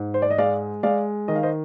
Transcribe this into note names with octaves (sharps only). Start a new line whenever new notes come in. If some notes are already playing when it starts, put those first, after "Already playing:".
Already playing: G#2
C5
D5
D#5
G#3 D5 F5
G#3 D5 F5
D#3 D#5
F5
C5 D#5